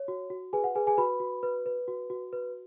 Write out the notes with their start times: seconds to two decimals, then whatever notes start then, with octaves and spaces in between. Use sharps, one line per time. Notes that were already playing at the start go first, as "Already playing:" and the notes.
Already playing: C#5
0.08 F#4
0.30 F#4
0.53 G#4 B4 G#5
0.64 F#5
0.75 G#4 B4 G#5
0.87 G#4 G#5
0.97 F#4 B4 B5
1.20 F#4
1.43 B4
1.66 B4
1.88 F#4
2.10 F#4
2.33 B4